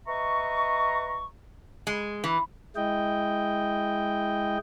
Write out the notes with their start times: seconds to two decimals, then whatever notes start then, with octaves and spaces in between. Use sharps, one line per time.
0.07 B4 D#5 E5 A#5 C#6
1.87 G#3
2.24 E3
2.76 G#3 E4 D#5 G5